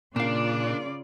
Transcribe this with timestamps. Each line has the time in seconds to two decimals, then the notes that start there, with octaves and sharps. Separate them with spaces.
0.16 A#2 C#3 A#3 D4 F4 D5 F5